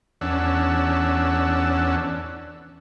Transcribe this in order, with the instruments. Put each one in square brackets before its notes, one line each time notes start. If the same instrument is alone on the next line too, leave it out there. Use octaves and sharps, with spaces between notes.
[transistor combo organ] E2 C#4 D4 F#5 E6